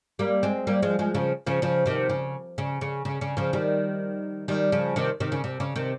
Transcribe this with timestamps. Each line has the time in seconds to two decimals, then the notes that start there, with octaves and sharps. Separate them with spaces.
0.19 G3 A#3
0.43 G#3 C4
0.67 G3 A#3
0.82 F3 G#3
0.99 F3 G#3
1.14 C#3 F3
1.47 C#3 F3
1.62 C#3 F3
1.86 C3 D#3
2.10 C#3
2.58 C#3
2.81 C#3
3.05 C#3
3.21 C#3
3.37 C#3 F3
3.53 D#3 G3
4.48 D#3 G3
4.72 C#3 F3
4.96 C3 D#3
5.20 C3 D#3
5.32 C#3
5.44 C3
5.60 C#3
5.76 C3 D#3